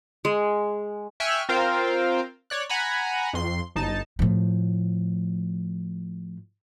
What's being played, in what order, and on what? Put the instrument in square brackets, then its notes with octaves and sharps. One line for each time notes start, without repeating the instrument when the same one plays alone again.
[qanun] G#3
[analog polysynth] E5 G5 G#5 C#6 F6 F#6
C4 F4 A#4 C5 F5 G5
C#5 D5 F#6
F#5 G#5 A#5 B5
F2 C6
G1 D#4 A5
[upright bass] A2 F3